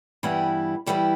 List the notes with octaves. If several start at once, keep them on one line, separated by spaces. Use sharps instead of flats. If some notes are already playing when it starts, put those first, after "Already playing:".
G2 E3 G3 B3 E4
G2 E3 G3 B3 E4